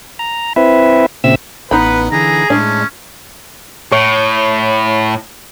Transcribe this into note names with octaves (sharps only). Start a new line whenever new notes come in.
A#5
C4 E4 B4 E5
A#2 C#3 C4 E5 E6
A1 B3 D#4 B4 F#5 B5
D3 E3 G#4 A#5
A2 G#3 C#4 D4
A2 C#5